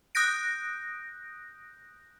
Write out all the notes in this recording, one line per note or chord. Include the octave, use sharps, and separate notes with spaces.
D#6 F#6 G6 A#6 D7